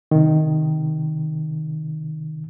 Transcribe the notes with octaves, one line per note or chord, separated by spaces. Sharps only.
C3 D#3